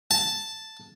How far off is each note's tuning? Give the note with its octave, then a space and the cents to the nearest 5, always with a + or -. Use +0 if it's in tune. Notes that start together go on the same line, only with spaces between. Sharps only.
A5 +0